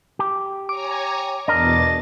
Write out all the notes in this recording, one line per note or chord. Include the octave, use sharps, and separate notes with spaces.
G4
C#5 G#5 A#5 D6
E2 B2 D4 A#4 D#5 A6